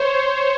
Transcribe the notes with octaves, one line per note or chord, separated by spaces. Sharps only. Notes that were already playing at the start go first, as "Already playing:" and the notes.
Already playing: C5 C#5
C5